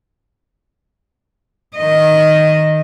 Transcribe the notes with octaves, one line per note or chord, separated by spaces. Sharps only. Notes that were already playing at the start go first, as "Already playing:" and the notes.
D#3 D#5